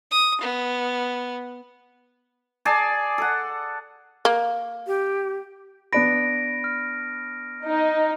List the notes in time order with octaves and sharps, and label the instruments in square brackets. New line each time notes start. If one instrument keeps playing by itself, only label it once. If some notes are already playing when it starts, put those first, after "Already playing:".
[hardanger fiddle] D#6
B3
[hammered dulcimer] G#4 D5 A5
A4 F#5
[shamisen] A#3
[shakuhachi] G4
[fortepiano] B3 D4 B5 [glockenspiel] A#6 D7
[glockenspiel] F6
[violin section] D#4